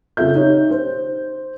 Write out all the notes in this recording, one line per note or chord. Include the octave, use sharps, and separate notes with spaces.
C#3 C4 F4 A4 E5 G6
D#4 G4 C#5
C5